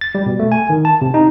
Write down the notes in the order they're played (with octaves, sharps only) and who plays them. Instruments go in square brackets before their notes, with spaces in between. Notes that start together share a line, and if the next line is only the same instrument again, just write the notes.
[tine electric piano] A6
G3
B2
A3
G#5
D#3
A5
C3
D#4